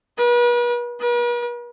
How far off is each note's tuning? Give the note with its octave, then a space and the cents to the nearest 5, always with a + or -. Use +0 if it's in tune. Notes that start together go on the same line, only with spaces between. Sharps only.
B4 -40
B4 -45